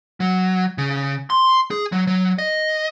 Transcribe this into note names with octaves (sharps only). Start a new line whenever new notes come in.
F#3
C#3
C6
G#4
F#3
F#3
D#5